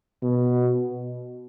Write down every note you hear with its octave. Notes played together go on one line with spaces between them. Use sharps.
B2